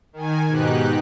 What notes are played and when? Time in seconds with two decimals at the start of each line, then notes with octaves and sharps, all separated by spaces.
0.13 D#3 G#5
0.48 G#2 B2 D#4 G4 F#6